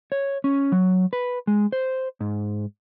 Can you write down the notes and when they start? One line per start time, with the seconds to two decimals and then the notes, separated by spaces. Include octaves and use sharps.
0.12 C#5
0.44 C#4
0.72 F#3
1.13 B4
1.47 G#3
1.72 C5
2.20 G#2